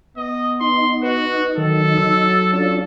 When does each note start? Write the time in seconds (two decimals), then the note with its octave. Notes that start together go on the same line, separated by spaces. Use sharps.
0.17 B3 D#5
0.61 D#4 C6
1.03 F#4 B4
1.57 D#3 F#3 A4
1.98 E6
2.53 C#4 D4 F4 A4